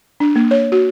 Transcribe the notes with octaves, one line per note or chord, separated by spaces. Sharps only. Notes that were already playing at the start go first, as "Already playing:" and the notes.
D4
A#3
C#5
F#4